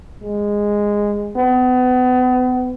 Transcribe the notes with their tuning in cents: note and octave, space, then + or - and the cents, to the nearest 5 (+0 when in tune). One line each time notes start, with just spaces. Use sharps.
G#3 -10
B3 +35